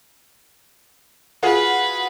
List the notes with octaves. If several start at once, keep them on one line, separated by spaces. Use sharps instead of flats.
F4 F#4 G#4 B4